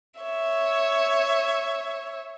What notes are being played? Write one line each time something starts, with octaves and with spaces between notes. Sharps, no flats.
C#5 E5